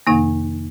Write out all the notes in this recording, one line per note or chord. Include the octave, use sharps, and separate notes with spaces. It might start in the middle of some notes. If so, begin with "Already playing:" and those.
F2 C3 D#3 A#3 D#4